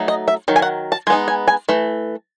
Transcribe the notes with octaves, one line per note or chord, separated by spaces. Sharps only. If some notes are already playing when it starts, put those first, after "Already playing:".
Already playing: F#3 A3 D#4
D#5
E5
D#3 F#3
G#5
F#5
A5
G#3 B3 D#4 G#5
G#5
G#5
E3 A3